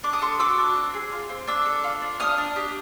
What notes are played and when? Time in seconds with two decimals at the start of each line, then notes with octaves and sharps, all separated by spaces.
0.03 D4 D6
0.13 D#6
0.21 A4 C6 D6
0.39 F#4 D6 E6
0.58 D4
0.76 C4
0.94 G#4
1.12 F4
1.29 C4
1.47 D4 D6 E6
1.66 A4
1.84 F4
2.02 D4
2.20 D4 D#6 F6
2.38 D4
2.56 G4